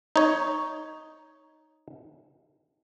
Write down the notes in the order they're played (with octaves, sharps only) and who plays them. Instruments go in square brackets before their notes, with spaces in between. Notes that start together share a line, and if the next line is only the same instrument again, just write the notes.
[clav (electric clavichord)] D#4 C#5